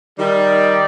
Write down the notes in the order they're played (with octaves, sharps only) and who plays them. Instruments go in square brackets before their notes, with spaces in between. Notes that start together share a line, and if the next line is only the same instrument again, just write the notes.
[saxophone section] D#3 G3 [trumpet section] D#4 G4 D5